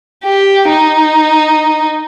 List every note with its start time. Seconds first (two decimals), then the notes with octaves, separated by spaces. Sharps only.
0.24 G4
0.68 D#4